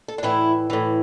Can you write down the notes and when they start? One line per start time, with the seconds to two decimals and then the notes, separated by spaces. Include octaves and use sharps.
0.08 A4
0.18 D4
0.23 A2 E3 E4
0.70 A2 E3